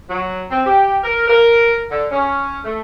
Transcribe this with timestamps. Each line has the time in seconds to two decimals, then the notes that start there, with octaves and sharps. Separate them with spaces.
0.09 F#3
0.50 C4
0.66 G4
1.03 A#4
1.28 A#4
1.91 D3
2.11 C#4
2.65 A3